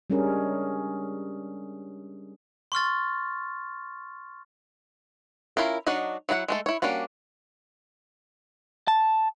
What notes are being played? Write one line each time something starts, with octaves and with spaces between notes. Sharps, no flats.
G3 G#3 C#4 D4 G#4 A#4
C6 C#6 F6 A6
C#4 E4 F4 A#4
F#3 D4 D#4 F#4 D#5
F#3 E4 G#4 F#5
G#3 A3 A4
E4 C#5
G3 A#3 C#4 D4 F#4
A5